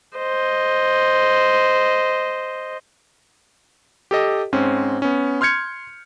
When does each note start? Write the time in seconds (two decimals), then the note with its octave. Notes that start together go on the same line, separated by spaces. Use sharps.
0.17 C5 D#5
4.11 G4 A4 D#5
4.53 G#2 C4 C#4
5.02 B3 C#4
5.41 C6 F6 G6 G#6 C#7